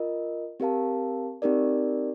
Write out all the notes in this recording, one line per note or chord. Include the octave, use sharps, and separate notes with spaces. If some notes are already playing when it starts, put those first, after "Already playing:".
Already playing: F4 A#4 D#5
C4 G4 A#4 F5 A5
C4 D#4 G4 A#4 D5